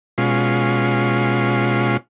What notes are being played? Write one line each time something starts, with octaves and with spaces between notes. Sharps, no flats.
B2 G#3 C#4 F4